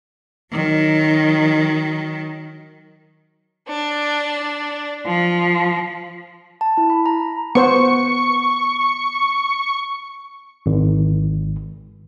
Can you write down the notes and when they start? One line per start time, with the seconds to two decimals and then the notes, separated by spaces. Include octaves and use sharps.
0.52 D#3 F#3
3.68 D4
5.06 F3
6.61 A5
6.78 E4
6.90 B5
7.06 A#5
7.55 B3 C5 C#6
10.66 G#1